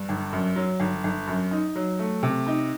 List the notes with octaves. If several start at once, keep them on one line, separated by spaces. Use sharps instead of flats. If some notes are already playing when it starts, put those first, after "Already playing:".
Already playing: G2
G1
F#2
F#3
G1
G1
F#2
D#4
F#3
A3
C3
D#4